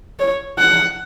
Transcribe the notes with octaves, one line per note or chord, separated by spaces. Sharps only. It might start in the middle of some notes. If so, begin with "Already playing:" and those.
C#5
F#5